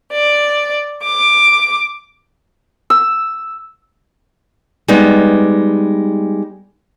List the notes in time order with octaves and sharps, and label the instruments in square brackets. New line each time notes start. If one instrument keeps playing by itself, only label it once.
[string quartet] D5
D6
[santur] E6
[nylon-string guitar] G3 G#3 B3 D#4